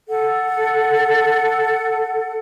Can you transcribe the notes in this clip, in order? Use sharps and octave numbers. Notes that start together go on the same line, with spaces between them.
A4 F#5